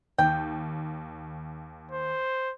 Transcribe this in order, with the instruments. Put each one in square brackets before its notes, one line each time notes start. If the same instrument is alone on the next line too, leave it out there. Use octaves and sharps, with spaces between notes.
[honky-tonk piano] D#2 [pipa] G5
[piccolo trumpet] C5